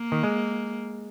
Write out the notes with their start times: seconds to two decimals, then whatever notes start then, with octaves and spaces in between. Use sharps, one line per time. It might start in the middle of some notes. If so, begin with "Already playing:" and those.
Already playing: A#3
0.12 D#3
0.23 G#3